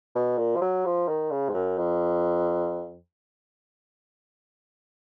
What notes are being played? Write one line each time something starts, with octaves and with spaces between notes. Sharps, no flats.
B2
A#2
F3
F#3
F3
D#3
C#3
G#2
F#2
F2